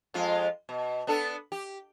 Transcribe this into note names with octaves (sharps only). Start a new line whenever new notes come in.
F2 G#3 F4
B2
B3 D4 A4
G4